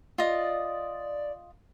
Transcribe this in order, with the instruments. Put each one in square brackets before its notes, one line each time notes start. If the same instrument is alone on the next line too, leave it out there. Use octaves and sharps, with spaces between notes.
[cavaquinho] F4 D#5 [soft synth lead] D5